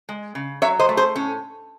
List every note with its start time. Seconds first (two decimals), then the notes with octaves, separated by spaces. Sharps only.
0.09 G#3
0.35 C#3
0.62 F#3 C#5 E5
0.79 C5 D#5
0.89 A3
0.97 G#4 C5
1.16 A2 C#4